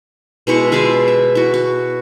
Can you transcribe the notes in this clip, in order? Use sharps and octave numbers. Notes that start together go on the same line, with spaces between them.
B2 G#3 E4 C#6
F4 G#4 D5 E5
E5
E4 F#4
F#4